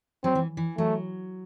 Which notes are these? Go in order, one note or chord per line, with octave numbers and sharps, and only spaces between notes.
F#3 C4
E3
E3
F#3 A3